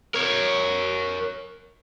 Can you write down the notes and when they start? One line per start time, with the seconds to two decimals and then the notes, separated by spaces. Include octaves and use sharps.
0.14 A#4 C#5